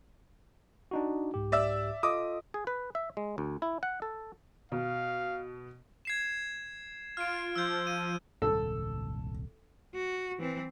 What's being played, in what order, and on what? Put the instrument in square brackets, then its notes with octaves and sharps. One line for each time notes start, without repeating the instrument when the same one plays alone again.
[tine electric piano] D4 D#4 F#4
C2 G#2 G4
[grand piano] D5 E5 E6
[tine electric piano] F4 A4 D#5 [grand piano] D6 D#6
[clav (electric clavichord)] G#4
B4
E5
G#3
D2
E4
F#5
A4
[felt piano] B2 [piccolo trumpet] F5
[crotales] G#6 C7 E7
[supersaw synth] F4 [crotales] F6 D7
[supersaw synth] F3 [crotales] E6 G6
[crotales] D#7
[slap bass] D#1 C2 G#2 [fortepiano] A4
[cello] F#4
E3 C4